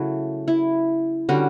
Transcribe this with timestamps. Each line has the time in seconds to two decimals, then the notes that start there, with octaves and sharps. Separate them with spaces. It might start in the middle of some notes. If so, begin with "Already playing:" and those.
Already playing: C#3 F#3 A3 E4 F#4
0.48 E4
1.29 D3 G3 C#4 F#4